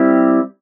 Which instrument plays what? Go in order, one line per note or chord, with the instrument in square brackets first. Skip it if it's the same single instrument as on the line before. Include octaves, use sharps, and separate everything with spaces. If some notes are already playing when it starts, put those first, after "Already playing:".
Already playing: [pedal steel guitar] G3 C4 E4 G4